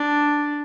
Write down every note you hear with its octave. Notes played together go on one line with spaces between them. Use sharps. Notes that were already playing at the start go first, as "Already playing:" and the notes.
Already playing: D4